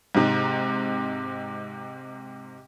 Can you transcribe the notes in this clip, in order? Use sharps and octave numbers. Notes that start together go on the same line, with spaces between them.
G#2 C3 D#4